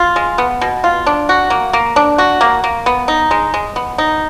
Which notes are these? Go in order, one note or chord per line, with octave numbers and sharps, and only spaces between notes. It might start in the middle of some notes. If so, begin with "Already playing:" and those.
Already playing: F4
G#3
B3
B2
F4
D4
F#4
A#3
A#3
D4
F#4
A#3
A#3
B3
D#4
G#3
G#3
B3
D#4